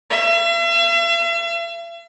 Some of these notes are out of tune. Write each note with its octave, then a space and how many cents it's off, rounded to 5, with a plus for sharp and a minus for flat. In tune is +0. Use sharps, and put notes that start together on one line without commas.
E5 +45